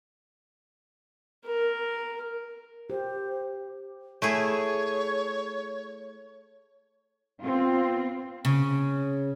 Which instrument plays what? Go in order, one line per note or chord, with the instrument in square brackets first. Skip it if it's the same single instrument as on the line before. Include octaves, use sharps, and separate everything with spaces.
[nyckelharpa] A#4
[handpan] G4 [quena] C5
[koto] A3 E4 G#4 [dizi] C#5
[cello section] B3 C4 F4
[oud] C#3